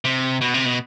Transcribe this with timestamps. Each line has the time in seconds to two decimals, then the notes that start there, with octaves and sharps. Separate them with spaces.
0.05 C3
0.41 B2
0.54 C3
0.66 B2